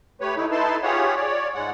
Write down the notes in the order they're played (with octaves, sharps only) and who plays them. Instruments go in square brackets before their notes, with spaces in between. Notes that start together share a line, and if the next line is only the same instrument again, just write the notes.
[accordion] A3 G4 B4 C#5
D3 D#4 E4
D#4 E4 A4 B4 A5 C6
F4 G4 G#4 C#5 F#5
C#5 D5
G#2 G#3 F#5